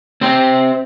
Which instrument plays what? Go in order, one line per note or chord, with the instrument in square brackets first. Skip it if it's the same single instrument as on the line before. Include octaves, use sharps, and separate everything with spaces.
[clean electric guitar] C4 G4 C5